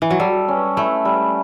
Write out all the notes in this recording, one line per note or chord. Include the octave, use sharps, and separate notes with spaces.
E3
F#3
G3 A4
C#4
A3 E4
G3